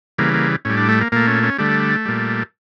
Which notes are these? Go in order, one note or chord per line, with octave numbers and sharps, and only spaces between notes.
C#3 E3 G3 A#3
A#3
A2 G3 C#4
D4
A3
A#3
A#2 A3 A#3
C#4
C#4
D3 G3 A3
A#2 G3